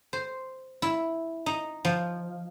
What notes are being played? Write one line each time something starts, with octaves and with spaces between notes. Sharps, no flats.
C5
E4
D#4
F3